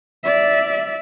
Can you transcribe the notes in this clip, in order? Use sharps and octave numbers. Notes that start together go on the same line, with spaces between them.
D5 E5